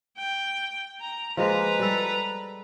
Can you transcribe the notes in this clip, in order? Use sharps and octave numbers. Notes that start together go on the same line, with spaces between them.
G5
A#5
F3 G#3 A#3 B4 A#5
G3 A4